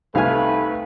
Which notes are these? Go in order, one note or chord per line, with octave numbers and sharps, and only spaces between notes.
C2 A3 D#4 G4 B4 F5 G#5 F6